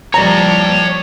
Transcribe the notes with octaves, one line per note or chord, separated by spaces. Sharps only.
F3 G3 C#5 A5 A#5